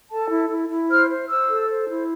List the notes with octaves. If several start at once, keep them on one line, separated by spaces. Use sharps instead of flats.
A4 A5
E4
E4
E4
C5 F6
C5
C5 E6
A4
C5
E4